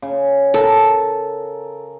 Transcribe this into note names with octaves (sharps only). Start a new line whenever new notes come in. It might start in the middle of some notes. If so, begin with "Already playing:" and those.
C#3
A4 A#4